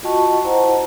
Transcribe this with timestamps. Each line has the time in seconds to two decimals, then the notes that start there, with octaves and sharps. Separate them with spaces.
0.03 F4 F#4 D#5 G5 A5 C#6
0.44 E4 C5 D#5 F#5 A5 A#5